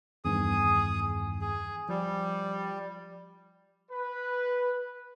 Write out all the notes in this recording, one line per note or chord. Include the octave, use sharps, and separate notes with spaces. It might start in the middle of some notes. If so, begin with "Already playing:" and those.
E2 G2 D#3 G#4 D#6
G#4
F3 G3
B4